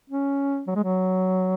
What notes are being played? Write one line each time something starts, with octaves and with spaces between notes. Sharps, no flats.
C#4
F#3
G#3
F#3